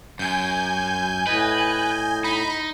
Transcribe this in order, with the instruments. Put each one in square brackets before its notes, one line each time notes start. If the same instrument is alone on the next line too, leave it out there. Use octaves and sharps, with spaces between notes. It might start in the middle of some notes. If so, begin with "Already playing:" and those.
[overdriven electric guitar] F#2 [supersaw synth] G#5 G6
[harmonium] A2 D#5 [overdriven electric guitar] B4
[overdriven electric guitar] D#4 [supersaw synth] B5